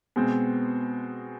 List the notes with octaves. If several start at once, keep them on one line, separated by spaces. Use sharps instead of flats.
B2 G#3 C4